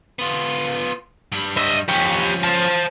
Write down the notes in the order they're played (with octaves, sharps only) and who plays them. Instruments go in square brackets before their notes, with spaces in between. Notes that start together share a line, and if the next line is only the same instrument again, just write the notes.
[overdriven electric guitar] B3 F4
G2 G3
[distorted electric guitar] D#5 E5
[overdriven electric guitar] F3 C#4 [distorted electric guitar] G4 C#5
[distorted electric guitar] C5 A5